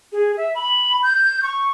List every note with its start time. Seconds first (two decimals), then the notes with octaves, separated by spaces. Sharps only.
0.12 G#4
0.37 E5
0.55 B5
1.03 G6
1.43 C#6